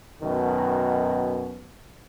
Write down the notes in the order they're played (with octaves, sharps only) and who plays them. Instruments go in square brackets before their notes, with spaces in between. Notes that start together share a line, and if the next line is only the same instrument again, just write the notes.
[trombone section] F#2 B2 D#3